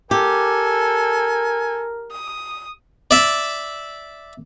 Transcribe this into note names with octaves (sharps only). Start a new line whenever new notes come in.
G4 A4 A#4 G#5
D#6
D5 E5